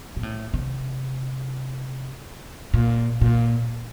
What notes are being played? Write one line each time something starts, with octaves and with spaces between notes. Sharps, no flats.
A#2
A2
C3
A#2
A#2